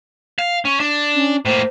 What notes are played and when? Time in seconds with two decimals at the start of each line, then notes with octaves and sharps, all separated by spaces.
0.39 F5
0.65 C#4
0.80 D4
1.15 C#4
1.45 A2 A#3 C5